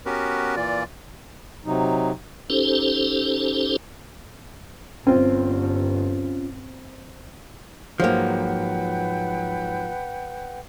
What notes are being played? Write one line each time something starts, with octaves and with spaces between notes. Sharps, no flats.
B3 C#4 F#4 G4 A#4 B4
A#2 E3 F4 D5
C3 F#3 D#4
C#4 D#4 G4 A4 C5
G1 C4 C#4 F4
G#2 F3 F#3 A#3 B4 F#5 G5